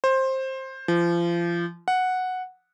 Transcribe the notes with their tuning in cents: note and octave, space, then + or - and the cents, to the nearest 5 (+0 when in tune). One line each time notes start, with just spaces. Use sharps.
C5 +15
F3 -30
F#5 -5